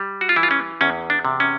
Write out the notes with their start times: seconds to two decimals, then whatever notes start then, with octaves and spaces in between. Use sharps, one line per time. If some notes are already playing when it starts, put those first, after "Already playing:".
Already playing: G3
0.21 F#4
0.29 F4
0.36 E3 E4
0.43 F4
0.51 C#4
0.81 E2 C#4
1.10 D4
1.25 C3
1.40 C#4